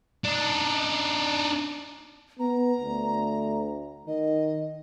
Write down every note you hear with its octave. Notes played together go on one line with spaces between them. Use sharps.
D4 D#4
B3 A#5
D2
D#3 D#5